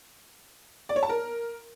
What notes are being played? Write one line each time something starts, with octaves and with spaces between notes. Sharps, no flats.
D5
C#5
A5
A#4